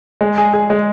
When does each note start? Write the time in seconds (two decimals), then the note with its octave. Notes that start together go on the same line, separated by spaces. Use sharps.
0.21 G#3
0.38 G#4
0.53 G#4
0.70 G#3